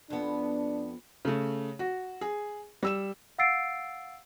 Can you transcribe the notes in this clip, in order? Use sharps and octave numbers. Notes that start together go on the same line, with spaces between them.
F2 B3 D4
C#3 A3
F#4
G#4
G3 E6 E7
F5 F#5 E6 A6 C7 D7